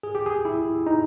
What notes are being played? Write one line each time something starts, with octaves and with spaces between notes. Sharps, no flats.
G#4
G4
G#4
E4
D#4